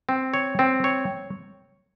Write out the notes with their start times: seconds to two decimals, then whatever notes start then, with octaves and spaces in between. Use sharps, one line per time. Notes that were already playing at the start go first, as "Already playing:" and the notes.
0.09 C4
0.34 C#5
0.59 C4
0.84 C#5